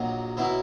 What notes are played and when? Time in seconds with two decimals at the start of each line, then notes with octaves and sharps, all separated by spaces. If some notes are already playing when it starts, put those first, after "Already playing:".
Already playing: A#1 A#2 F#3 D#5
0.37 B2 F#3 E4